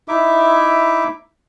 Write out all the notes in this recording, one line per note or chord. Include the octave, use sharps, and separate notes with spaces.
D#4 E4 E5 D6